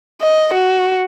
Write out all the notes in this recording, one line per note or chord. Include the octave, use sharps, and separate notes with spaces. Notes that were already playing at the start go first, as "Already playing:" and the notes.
D#5
F#4